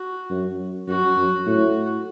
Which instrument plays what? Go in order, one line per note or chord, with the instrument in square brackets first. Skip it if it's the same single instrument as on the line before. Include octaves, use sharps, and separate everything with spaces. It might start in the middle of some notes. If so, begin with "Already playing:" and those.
Already playing: [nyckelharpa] F#4
[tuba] F#2
[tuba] F#2 [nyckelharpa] F#4
[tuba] F#2
[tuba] A2 [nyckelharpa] F#4